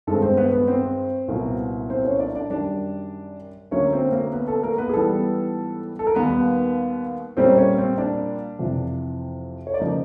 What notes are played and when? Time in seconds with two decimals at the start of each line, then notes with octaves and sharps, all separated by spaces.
0.07 G2 D#3 G#3 C4 A4
0.22 C4 C5
0.37 B3 B4
0.53 B3 B4
0.68 C4 C5
1.28 C2 A#2 F#3 B3
1.90 C4 C5
2.05 C#4 C#5
2.20 D4 D5
2.35 D4 D5
2.50 F#2 D#3 G3 D4 D5
3.71 D2 D3 F#3 A#3 C#4 C#5
3.93 C4 C5
4.12 A#3 A#4
4.32 B3 B4
4.48 A4
4.63 A#3 A#4
4.78 B3 B4
4.89 G#4
4.94 G#2 E3 G3 B3 A4
5.99 A4
6.07 A#4
6.15 D#2 D#3 G3 B3 B4
7.37 A#2 G3 A#3 C4 C#4 C5
7.58 C#4 C#5
7.78 C4 C5
7.98 D4 D5
8.59 F2 C3 E3
9.67 C#5
9.74 D5
9.80 C#3 F3 A#3 D#4 D#5